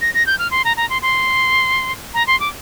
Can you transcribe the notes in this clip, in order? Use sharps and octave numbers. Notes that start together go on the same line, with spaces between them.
A#6
A#6
G6
F6
C6
A#5
A#5
C6
C6
A#5
C6
D6